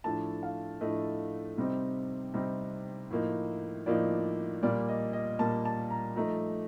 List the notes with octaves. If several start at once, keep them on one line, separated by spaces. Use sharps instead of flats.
A2 F3 A3 D4 A5
F5
A2 F3 A3 D4 D#5
C3 G3 C4 D#4
C3 G3 C4 D#4
A2 F3 A#3 D#4
A2 F3 A#3 D#4 D5
A#2 G3 A#3 D5
D#5
D#5
A#2 G3 A#3 A5
A5
A#5
F3 A3 D#4 A#5